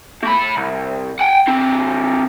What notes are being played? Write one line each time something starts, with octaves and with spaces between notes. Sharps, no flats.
A3 B5
C2
F#5 G5
D3 C4